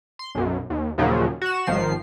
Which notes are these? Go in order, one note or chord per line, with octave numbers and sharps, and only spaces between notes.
C6
B1 F#2
D#2
D#2 A#2 C#3 F3 F#3
F#4 E7
G#1 D#3 F3 C7